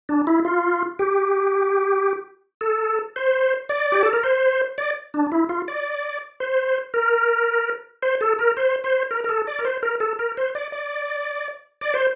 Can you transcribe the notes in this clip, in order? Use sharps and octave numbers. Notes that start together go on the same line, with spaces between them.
D4
E4
F4
G4
A4
C5
D5
G4
A4
A#4
C5
D5
D4
E4
F4
D5
C5
A#4
C5
A4
A#4
C5
C5
A#4
A#4
A4
D5
A#4
C5
A#4
A4
A#4
C5
D5
D5
D5
C5